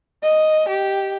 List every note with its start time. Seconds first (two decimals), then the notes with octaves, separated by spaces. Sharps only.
0.23 D#5
0.68 G4